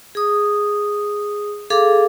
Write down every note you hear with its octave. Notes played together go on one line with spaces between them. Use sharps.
G#4 D#6
G#4 A4 F5 D6